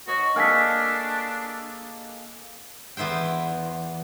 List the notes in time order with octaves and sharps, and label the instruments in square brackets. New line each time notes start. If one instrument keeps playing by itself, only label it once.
[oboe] F#4 [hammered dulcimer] C#5 D#5
[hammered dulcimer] A#3 G#4 A4 [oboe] D4 [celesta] F6 B6
[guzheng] E2 B3 E4 C5 G5